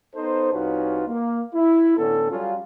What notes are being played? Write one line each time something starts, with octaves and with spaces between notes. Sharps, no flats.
B3 D#4 A4 C5
C2 C#4 D#4 F4 F#4 B4
A#3
E4
A2 D3 B3 C#4 A4
F#3 G3 C#4 F4